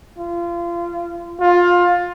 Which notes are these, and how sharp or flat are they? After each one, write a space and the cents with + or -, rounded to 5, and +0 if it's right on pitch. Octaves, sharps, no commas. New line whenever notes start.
F4 -25
F4 +15